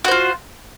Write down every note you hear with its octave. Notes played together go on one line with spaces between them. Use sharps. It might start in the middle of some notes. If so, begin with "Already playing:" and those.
F4 F#4 C5